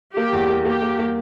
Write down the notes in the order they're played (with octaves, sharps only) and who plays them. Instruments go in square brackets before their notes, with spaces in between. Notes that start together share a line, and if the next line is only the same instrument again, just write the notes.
[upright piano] A#3 [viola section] G4
[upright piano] E2
A#3
[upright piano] A#3 [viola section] G4
[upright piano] A#3
A#3